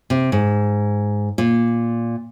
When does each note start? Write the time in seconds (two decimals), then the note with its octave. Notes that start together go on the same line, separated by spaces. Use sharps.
0.10 C3
0.32 G#2
1.38 A#2